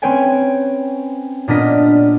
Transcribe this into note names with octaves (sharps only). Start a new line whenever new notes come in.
C4 C#4 B4 C#5 G5 G#5
A#2 B3 D4 A#4 D#5 B6